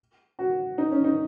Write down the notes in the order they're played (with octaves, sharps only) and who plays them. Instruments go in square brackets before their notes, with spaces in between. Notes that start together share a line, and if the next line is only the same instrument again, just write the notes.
[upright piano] F#4
D#4
C#4
D#4